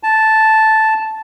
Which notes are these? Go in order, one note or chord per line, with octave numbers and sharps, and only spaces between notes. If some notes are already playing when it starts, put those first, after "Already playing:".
A5